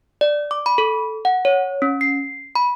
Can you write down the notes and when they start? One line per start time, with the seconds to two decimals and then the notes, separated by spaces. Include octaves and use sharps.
0.21 D5
0.51 D6
0.66 B5
0.78 A4
1.25 F#5
1.45 C#5
1.82 C#4
2.01 C7
2.55 B5